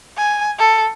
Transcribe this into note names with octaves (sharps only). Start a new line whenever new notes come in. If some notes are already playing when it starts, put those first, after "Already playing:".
G#5
A4